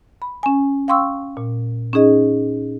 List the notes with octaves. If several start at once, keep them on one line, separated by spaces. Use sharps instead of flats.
B5
C#4 G#5
F5 G5 C6 C#6 E6
A#2
C#4 D#4 G#4 D#5